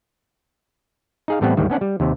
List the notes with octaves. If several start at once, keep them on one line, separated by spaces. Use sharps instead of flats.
D#4 G#4 F5
A2 E3 G3 B3 C4
D2 G#2 D#3 G3
B3 C#4 D4 F#5
G3
D#2 C3